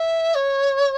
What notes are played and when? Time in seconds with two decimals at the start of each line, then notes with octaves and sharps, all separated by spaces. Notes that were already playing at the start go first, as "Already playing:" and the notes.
Already playing: E5
0.35 C#5